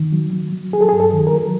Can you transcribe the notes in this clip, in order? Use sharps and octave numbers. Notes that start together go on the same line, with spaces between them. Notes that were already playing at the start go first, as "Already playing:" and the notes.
Already playing: D#3
F#3
F#3
F#3
F#3 G#4
A4
G#4
G2
A4
D#3
A#4
F#3